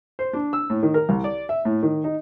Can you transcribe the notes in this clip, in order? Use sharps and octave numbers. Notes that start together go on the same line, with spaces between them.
C5
D4
E6
A2
D#3
A#4
C2
D5
E5
A2
D#3
D#4